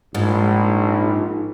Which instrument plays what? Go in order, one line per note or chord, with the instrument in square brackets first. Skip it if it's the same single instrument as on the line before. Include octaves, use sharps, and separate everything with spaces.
[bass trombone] A#1 [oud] G#2